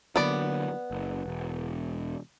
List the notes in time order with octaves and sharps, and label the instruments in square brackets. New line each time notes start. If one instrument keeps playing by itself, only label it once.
[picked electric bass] D3 F#3 A#3 [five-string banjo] B3 D5
[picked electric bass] F#1
E1